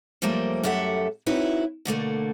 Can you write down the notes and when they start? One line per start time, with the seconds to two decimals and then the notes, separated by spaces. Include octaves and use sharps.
0.22 F#2 F3 G3 A3 A#3 C5
0.63 F#2 G4 A4 E5 F#5
1.26 C4 D#4 E4 F#4 B4 C#5
1.85 B2 D3 A3 A#3